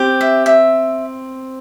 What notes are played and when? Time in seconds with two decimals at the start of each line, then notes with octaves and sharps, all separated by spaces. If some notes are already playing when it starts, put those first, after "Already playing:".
Already playing: C4 G4
0.21 E5
0.46 E5